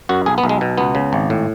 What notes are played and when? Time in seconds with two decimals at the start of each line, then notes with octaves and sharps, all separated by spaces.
0.09 F#2 F#4
0.26 B1 G#4
0.38 B3
0.44 B1
0.49 G#3
0.61 B2
0.78 C#2 B3
0.95 C#3
1.13 G#1
1.30 A2